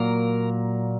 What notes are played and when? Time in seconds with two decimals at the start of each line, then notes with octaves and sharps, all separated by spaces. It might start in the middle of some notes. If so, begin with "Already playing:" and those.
Already playing: A#2 F#3 A#3 A#4